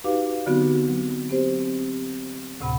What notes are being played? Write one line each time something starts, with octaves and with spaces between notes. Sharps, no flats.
D#4 F#4 G4 B4 F5 D6
D3 F#3 B3 C4 D#4 F#4
F#3
C4 G4 C5
C4
D2 A2 C3 F#5 B5